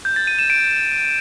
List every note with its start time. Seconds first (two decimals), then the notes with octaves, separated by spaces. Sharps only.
0.05 G6
0.16 A6
0.27 D#7
0.39 E7
0.50 D7